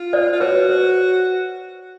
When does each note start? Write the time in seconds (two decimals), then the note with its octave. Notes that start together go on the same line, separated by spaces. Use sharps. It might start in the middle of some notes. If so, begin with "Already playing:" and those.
Already playing: F4
0.13 C5 D5
0.33 F4
0.40 F#4 B4 C#5
0.69 C5